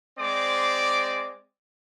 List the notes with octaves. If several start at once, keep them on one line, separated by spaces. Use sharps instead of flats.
G#3 C4 C5 D5 D6